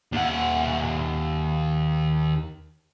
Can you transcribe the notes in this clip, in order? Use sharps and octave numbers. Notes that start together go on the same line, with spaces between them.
D#2 F#5